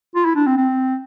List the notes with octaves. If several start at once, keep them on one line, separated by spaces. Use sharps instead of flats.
F4
E4
D4
C4
C4